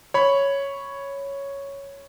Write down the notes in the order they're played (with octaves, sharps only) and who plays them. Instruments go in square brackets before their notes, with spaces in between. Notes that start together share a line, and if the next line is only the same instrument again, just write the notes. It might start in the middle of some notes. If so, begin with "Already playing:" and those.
[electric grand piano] C#5 B5